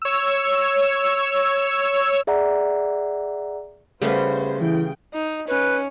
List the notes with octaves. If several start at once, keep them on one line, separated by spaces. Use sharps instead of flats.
C#5 E6
G#4 D5 E5 F#5 A#5
C#3 G3 A3 B3 F4 B4 C5
E3 G#4 G5
D#4
C#4 B4